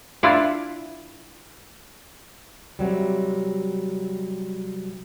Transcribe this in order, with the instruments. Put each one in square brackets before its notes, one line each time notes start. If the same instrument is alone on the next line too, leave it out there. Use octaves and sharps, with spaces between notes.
[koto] D4 E4 F4 D5
[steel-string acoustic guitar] C3 F#3 G3